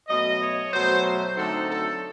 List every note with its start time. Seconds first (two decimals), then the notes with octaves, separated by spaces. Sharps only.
0.08 B2 F#3 A3 D#5
0.41 C#5
0.73 B2 F#3 A3 C5
1.05 C5
1.36 D3 F#3 A3 C4 D#4 A4
1.69 A4